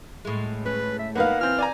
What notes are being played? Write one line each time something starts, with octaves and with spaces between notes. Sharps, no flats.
A2 G#3
C#4 B4
E5
A#3 B3 D#4 A#4 B4 F5 F#5
E3 C4 F6
D5 G#5 A#5